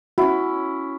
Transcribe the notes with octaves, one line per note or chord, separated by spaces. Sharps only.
C#4 E4 F#4